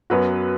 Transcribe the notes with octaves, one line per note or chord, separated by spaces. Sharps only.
F#2 F#3 B3 F#4 B4